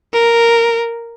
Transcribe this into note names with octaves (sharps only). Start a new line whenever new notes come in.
A#4